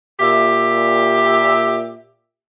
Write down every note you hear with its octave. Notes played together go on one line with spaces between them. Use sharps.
A#2 G4 E5